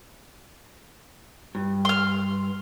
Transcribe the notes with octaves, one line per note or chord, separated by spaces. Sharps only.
G2
C6 F6